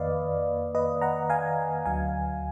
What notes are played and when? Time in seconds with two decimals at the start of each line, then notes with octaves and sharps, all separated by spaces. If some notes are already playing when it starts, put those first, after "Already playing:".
Already playing: F2 D#3 A#3 B4 D5 D#5 F5
0.75 B4 D#5
1.02 F#5 A#5
1.30 F5 G#5
1.86 D2 D3 F#3 F5 G#5